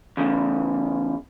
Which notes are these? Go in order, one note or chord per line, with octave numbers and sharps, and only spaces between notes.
E2 C#3